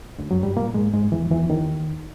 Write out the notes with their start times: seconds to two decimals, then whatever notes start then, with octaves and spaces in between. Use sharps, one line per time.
0.18 D2 D3
0.31 F#2 F#3
0.43 G2 G3
0.56 A#2 A#3
0.74 G#2 G#3
0.94 G#2 G#3
1.12 E2 E3
1.31 E2 E3
1.50 D#2 D#3